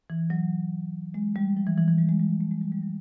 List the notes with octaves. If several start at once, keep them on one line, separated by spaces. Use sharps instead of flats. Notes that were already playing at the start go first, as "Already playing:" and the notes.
E3
F#3
G#3
G3
F3
E3
E3
E3
G3
G#3
G3
A3
G#3
G3
G3
F#3